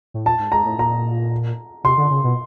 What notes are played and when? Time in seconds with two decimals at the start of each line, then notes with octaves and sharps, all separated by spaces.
0.14 A2
0.26 A#2 A5
0.39 G#2
0.52 G#2 A#5
0.65 A2
0.78 A#2 A#5
1.84 C3 C6
1.98 D3
2.10 C#3
2.24 B2